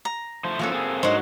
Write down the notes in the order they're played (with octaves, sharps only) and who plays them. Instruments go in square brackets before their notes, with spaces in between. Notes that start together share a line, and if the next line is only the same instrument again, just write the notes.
[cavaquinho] A#5
[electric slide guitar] F3 A3 C5
[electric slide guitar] F3 A3 C#4 [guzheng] A#3 F#4 A4
[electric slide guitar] C4 G#4
[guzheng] G#2 D4 [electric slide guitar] F#4 C#5 [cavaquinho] C5 D#5